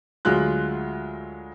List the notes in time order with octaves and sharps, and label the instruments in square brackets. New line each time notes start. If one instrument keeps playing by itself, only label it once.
[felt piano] D2 F#3 G#3 F4 F#6